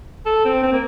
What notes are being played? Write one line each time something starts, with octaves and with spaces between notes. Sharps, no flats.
A4
C4
C4
A#3